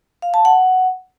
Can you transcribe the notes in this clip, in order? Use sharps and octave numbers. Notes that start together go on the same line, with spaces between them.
F5
A5
F#5